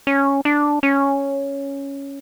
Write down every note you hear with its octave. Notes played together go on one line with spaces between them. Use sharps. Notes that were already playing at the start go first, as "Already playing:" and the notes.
C#4
D4
C#4